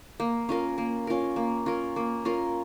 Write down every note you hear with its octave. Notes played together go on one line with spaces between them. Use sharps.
A#3
C#4 F4 A#4
A#3
C#4 F4 A#4
A#3
C#4 F4 A#4
A#3
C#4 F4 A#4